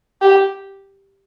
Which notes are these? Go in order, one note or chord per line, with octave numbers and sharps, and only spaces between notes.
G4